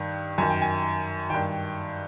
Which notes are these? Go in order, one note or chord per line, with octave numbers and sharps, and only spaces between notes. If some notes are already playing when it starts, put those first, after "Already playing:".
Already playing: G2 D#3
F#2 D#3 G#5
G5
G#5
G2 D#3 G5